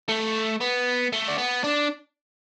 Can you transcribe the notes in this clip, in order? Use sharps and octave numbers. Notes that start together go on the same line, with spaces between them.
A3
B3
A3
D4
B3
D4